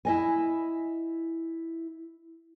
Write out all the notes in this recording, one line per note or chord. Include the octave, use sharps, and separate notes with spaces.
E4 D#5 G#5